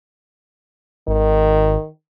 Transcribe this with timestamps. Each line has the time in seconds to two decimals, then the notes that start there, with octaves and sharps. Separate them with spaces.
1.08 G#1 D#3